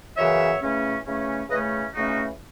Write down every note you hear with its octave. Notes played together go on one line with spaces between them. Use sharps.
F#2 C#3 E3 B3 C#5 E5
C#3 E3 A3 C#4
C#3 E3 A3 C#4
C#3 E3 A3 C#4 B4 D#5
C#3 E3 A3 C#4 D#4 F#4